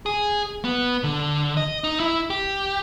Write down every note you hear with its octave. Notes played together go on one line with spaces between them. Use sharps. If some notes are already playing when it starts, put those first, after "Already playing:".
G#4
B3
D3
D#5
D#4
E4
G4